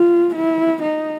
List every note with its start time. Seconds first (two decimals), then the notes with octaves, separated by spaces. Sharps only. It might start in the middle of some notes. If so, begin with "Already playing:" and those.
Already playing: F4
0.35 E4
0.83 D#4